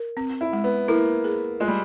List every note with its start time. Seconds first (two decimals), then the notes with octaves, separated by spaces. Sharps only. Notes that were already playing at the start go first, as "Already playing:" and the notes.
Already playing: A#4
0.17 C4
0.41 E4
0.53 G#3
0.64 B3
0.88 A#3 E4
1.24 G#4
1.60 G#3 F4
1.68 G3